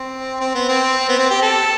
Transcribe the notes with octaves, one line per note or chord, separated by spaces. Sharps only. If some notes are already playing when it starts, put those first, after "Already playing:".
Already playing: C4
C4
B3
C4
B3
C4
G4
A4